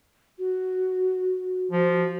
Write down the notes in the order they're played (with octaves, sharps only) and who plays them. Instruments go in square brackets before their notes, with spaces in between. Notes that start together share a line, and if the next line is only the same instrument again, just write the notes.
[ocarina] F#4
[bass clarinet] F3 [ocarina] F#4